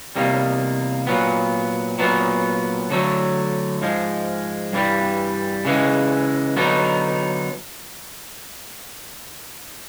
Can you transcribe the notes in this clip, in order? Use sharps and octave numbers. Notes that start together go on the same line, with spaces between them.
E2 C3 D#3 G3 A#3
A#2 F#3 B3
A#2 F#3 B3
D3 F#3 A3
G#2 F3 G#3
G2 E3 G3
C#3 E3 G#3
D3 F#3 B3 D#4